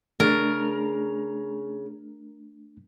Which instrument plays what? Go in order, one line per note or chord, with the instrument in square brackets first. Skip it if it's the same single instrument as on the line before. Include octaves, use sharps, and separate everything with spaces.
[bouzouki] C#3 [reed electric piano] A3 D4 A6 [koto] A#4